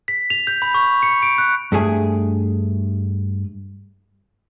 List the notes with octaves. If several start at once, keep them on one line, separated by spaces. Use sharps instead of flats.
B6
F7
G6
B5
C#6
C#7
D7
F#6
G2 A3 G#4